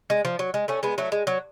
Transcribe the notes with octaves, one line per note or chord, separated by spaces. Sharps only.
G#3
F3
F#3
G#3
A3 C#4
G#3 B3
F#3 A3
G#3
F#3